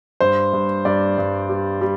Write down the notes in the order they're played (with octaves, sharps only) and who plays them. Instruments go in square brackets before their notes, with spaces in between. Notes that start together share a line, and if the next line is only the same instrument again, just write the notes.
[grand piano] G2 C5
G2
G2 D5
G2
G3
G3